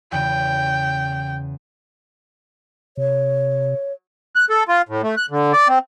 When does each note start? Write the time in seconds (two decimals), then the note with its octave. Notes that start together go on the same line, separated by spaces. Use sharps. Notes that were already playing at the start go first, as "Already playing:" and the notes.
0.12 E2 C#3 G5
2.97 C3 C#5
4.36 F#6
4.50 A4
4.68 F4
4.89 A2
5.03 A3
5.17 F#6
5.30 D3
5.53 D5
5.68 C4